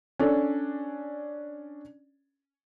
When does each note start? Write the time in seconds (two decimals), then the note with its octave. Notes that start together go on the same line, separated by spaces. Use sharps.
0.19 C#4 D4 A4